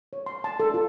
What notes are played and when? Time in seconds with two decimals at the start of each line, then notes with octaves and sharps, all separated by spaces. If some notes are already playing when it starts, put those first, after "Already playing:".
0.13 C#5
0.26 C6
0.44 A5
0.60 A4
0.74 F4